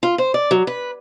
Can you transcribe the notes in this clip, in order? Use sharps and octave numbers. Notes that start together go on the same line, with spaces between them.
F4
C5
D5
F#3
B4